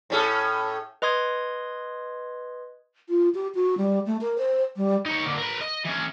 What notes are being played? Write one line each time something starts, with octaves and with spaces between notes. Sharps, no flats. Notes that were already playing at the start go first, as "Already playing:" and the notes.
A2 C#4 A4
B4 D#5 C6 D#6 G#6
F4
G4
F#4
G3
A3
A#4
C5
G3
D#4 C#5
D3 A#3
A#4 B4
D#5
E3 C#4